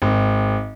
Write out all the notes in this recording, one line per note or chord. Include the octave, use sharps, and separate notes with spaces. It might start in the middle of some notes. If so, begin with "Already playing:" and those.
G#1